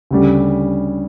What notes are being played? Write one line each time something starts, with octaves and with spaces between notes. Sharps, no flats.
D2 C#3 G3